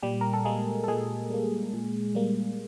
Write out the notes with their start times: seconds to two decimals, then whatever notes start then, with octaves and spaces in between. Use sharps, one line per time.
0.03 A#2 G3 G4
0.21 A#4
0.33 A4
0.45 G3 G#3 A#3 G#4
0.84 A4
0.88 A#2 G#3 G#4
1.30 G3 A#3
1.73 A#2
2.15 G3 A#3